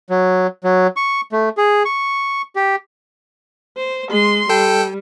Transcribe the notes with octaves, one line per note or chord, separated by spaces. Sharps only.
F#3
F#3
C#6
A3
G#4
C#6
G4
C5
G#3 C6
G3 A4 G5